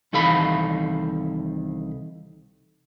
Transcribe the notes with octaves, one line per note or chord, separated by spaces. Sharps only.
C2 D#3 E3 A4 F5 B5